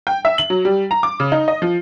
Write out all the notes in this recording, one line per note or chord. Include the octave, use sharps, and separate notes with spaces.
G5
E5
F#7
F#3
G3
A#5
D6
C#3
D#4
D#5
F3